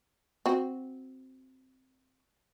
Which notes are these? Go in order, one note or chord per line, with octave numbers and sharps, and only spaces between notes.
C4 F#4